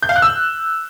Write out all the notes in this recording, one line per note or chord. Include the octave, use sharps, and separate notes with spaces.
G6
F5
F#6
E6